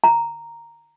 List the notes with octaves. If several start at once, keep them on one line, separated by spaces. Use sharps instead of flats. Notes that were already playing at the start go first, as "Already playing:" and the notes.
A#5